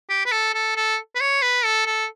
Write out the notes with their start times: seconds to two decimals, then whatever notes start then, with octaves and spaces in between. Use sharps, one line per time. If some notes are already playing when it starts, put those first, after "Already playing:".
0.10 G4
0.26 B4
0.32 A4
0.54 A4
0.77 A4
1.16 B4
1.21 C#5
1.42 B4
1.65 A4
1.86 A4